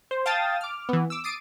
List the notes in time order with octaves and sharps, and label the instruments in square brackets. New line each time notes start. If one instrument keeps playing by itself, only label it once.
[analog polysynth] C5
F5 G5 A5 D#6 A6
D6 F6
E3 B3
D6 E6
D6 D#6 A6 C7 D7 D#7